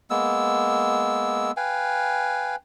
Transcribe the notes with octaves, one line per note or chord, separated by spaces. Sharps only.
G#3 A#3 B3 E6
B4 F5 G5 G#5